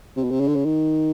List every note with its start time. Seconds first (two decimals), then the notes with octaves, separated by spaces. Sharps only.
0.16 C3
0.23 B2
0.31 C3
0.40 C#3
0.48 D3
0.55 C#3
0.65 D#3